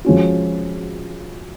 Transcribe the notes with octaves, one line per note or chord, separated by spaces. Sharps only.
F3 G#3 C#4 F#4